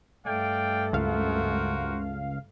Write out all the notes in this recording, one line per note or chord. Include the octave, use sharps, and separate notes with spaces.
G2 A3 D5 F5 G5
C#2 F#4 A#4 C5 F5